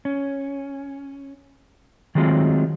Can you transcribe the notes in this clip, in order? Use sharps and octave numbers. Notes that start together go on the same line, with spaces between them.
C#4
D#3 F#3 G#3 A3 C4 F4